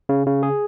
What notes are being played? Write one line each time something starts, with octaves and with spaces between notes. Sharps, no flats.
C#3
C#3
G#4